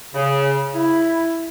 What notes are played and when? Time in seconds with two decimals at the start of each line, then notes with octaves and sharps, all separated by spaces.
0.15 C#3
0.75 E4